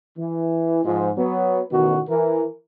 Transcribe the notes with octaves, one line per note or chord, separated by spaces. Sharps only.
E3
G#2 F3
F#3 B3
A1 B2 D#3 F#4
E3 A#4